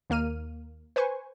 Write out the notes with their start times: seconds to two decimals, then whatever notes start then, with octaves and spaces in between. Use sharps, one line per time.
0.10 D#2 A#3 F6 D#7
0.96 B4 C5 G#5 C#6